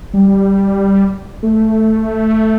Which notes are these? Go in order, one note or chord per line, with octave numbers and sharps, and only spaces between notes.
G3
A3